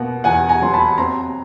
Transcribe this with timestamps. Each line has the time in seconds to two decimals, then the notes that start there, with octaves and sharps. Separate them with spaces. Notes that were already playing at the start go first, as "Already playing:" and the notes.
Already playing: B2 A#3 F#5
0.24 E2 F#5 G#5
0.49 G#5 A#5
0.62 F#3 C6
0.73 A5 B5
0.98 C4 A#5 C6